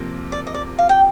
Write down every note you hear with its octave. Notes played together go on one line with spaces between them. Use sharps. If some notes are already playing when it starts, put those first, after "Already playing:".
Already playing: C3 F3 A#3
D5
D#5
D5
F5
G5